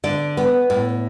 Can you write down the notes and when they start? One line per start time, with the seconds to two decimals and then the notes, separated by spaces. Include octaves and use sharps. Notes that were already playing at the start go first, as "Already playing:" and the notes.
0.04 D3 D5
0.37 B3
0.70 A2